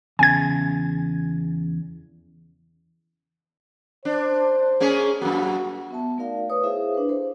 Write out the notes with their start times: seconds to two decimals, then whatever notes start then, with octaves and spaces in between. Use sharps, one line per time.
0.19 E2 C#3 G#5 G#6
4.05 D4 C5
4.80 A#3 C#4 G#4
5.21 F#2 A#3 F#4
5.91 B3 E5 A5
6.18 A3 D#4 F#4 A#4 D5 F5
6.50 B4 C#5 D#6
6.63 E4 G#4 C5 E5 F5
6.94 D4 B4
7.09 A4 C5